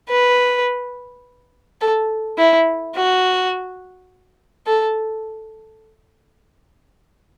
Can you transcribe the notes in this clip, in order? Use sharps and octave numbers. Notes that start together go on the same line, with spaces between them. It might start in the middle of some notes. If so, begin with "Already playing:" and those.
B4
A4
E4
F#4
A4